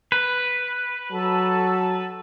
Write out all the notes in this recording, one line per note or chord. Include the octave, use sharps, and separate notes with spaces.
B4
F#3 A4 A5